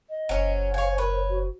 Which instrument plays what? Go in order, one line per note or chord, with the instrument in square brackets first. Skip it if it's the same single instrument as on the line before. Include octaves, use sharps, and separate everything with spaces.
[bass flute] D#5
[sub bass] F#1 [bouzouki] F#3 C#4 [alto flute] C5
[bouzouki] C#5 G#5 [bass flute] F5
[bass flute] A#4 [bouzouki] B4 C#5
[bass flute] F#4